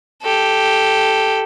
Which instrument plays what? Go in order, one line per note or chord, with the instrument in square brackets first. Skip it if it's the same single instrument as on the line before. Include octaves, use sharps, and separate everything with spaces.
[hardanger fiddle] G4 A4